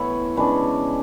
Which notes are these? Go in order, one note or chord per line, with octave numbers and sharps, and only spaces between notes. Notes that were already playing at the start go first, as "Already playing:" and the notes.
Already playing: A2 E3 B3 E4 B4 C#5 E5
C#3 G#3 D4 B4